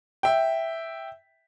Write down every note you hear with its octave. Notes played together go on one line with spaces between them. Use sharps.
E5 G5